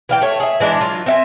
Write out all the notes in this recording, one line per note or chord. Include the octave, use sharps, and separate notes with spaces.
E3 F5 G5
A3 C#5
G#4 E5
E3 G#3 D4 E4
F#3 F4
C4 E5 G#5